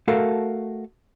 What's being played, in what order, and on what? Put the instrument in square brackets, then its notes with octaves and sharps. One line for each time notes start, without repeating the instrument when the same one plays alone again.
[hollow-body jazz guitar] A3 F#4 A4 A#4 F5